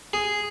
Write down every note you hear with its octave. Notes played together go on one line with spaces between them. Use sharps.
G#4